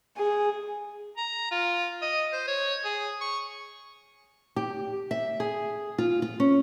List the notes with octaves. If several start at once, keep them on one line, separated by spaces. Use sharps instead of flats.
G#4
A#5
F4
D#5
C5
C#5
G#4
C#6
G4
E5
G#4
F4
F4
C#4